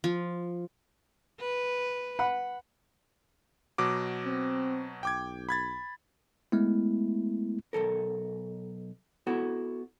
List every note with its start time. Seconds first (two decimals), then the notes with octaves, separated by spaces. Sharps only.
0.04 F3
1.40 B4
2.19 F#5 B5
3.78 B2 F#3 D6
4.25 C4
5.03 B1 G5 D6 G#6
5.49 B5 G#6 A6
6.52 G#3 A3 B3 E4
7.73 B1 C3 A4 A#4
9.27 B3 E4 F#4 A4